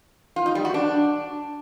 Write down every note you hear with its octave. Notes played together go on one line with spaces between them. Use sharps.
F4
D#4
G3
F#4
D4